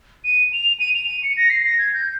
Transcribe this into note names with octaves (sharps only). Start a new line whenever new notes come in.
D#7
F7
D#7
F7
D#7
C#7
A#6
C7
A#6
G#6
G6